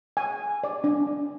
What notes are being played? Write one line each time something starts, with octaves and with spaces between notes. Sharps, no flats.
G#5
D5
D4